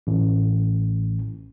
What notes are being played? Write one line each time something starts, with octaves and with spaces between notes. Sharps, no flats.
A1